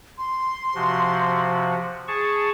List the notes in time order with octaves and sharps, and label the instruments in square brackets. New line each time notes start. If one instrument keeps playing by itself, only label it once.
[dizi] C6
[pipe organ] C3 F3 F#4
G#4 A5 C#6